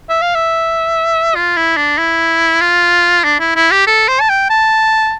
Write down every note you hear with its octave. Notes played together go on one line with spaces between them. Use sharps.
E5
F5
E5
F4
E4
D4
E4
F4
D4
E4
E4
G4
A4
C5
A5
G5
A5